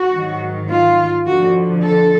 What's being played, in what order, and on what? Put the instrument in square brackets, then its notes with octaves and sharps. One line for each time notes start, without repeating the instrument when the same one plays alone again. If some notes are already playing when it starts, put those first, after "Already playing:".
Already playing: [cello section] F#4
G#2 D#3 F#3
F4
F2 D3 F3 F#4
A4